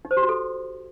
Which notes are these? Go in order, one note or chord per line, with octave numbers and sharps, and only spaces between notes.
D#4
C5
G4
F#4
A4